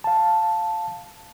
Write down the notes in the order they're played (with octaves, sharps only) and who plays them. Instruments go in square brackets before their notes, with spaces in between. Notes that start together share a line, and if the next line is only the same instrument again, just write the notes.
[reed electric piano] F5 A5